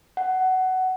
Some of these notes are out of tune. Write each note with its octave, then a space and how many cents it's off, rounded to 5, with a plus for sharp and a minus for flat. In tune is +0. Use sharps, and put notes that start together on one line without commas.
F#5 +15